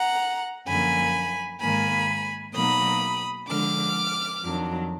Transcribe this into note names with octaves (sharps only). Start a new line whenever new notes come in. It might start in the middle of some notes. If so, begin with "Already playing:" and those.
Already playing: F#5 A#5
F#2 D3 F3 A#3 G#5 B5
G#2 D#3 A#3 G#5 B5
B2 F#3 A#3 D#4 B5 D#6
D3 F3 G#3 D4 D6 F6
F2 D#3 F#3 D4